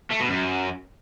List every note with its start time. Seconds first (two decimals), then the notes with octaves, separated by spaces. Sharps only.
0.11 A3
0.20 B2
0.29 F#2